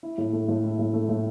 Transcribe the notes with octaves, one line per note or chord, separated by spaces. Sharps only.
E4
A2
A3
A2
E4
A2
A3
A2